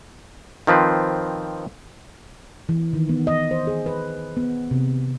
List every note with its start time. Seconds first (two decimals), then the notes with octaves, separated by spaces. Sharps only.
0.67 D#3 F3 C4 B4
2.69 E3
2.93 D#3
3.09 B3
3.27 D#5
3.51 C5
3.67 G#4
3.86 B4
4.37 B3
4.71 C3